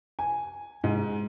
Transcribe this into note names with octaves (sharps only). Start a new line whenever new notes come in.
G#5
G#2